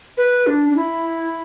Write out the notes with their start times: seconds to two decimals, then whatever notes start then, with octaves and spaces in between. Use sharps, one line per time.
0.17 B4
0.47 D4
0.69 D4
0.76 E4